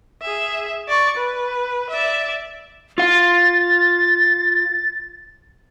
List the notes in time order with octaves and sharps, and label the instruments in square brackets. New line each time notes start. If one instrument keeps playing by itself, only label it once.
[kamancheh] G#4 E5
D5 C#6
B4
D5 E5
[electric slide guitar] F4 F5 [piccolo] A6